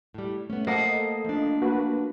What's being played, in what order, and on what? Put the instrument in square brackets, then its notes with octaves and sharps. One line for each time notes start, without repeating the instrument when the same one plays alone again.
[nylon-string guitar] A2 G3
[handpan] A3 [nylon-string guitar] B3 C#4
[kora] A#3 [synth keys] A4 D#5 [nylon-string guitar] C5 F#5
[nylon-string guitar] F3 D4
[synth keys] A#3 F#4 B4